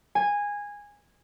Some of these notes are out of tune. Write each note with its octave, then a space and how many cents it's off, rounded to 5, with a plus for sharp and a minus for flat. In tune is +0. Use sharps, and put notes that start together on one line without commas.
G#5 -15